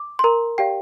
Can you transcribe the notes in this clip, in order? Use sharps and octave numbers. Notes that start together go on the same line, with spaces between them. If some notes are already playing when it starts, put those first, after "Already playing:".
Already playing: D6
C6
A#4 A#5
G4 D5 F5 G5